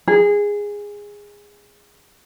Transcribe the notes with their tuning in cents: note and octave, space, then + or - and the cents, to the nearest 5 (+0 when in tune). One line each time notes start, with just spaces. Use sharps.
G#4 -15